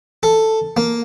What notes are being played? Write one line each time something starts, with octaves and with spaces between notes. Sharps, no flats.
A4
A#3